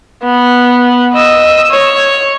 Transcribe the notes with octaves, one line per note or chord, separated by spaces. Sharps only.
B3
D#5 E6
C#5